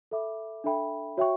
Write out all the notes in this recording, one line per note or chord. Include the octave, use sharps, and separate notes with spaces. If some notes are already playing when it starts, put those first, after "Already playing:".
A4 E5 B5 D6
D4 A4 E5 G5 B5
F#4 C#5 E5 G5 C#6